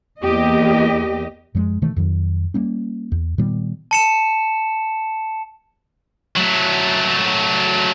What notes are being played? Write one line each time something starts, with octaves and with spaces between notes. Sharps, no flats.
E2 A#3 G4 D#5
F#2 F3 G3 G#3
B2 D#3 E3 A3
F2 D#3 F#3
G3 A#3 C#4
E2
A#2 D#3 G3 B3
A5 C#7 E7
F#3 A3